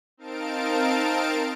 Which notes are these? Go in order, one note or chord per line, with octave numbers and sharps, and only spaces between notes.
C4 D#4 A#4 F5 A5 D7